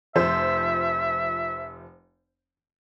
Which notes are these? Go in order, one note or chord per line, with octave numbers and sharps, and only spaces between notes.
F1 F3 C5 E5